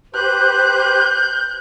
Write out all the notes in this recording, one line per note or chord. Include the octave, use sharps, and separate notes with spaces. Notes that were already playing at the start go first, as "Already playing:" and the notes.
G4 B4 C5 F#6 G6